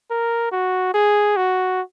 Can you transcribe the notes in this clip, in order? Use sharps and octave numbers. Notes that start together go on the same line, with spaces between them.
A#4
F#4
G#4
F#4